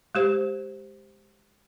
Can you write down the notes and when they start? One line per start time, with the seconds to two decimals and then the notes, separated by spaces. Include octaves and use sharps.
0.15 G#3 G4 C5